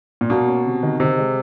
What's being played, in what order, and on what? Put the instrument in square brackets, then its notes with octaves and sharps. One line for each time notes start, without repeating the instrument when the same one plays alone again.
[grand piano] A#2
[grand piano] B2 [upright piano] A#3
[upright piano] C#4
C3
D#3
[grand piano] C3 [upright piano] D#3
[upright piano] G#3